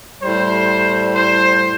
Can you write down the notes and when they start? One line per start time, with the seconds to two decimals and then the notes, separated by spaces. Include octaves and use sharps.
0.22 A2 G3 C5
1.16 C5